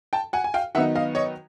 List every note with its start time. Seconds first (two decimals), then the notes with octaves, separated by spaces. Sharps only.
0.13 G5 A5
0.33 F#5 G#5
0.44 G#5
0.54 F5 G5
0.75 D#3 F#3 B3 D#4 E5 F#5
0.95 D#5 F5
1.15 C#5 D#5